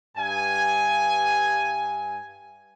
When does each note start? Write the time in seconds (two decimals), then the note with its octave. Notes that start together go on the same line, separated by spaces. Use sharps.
0.17 G2 G#5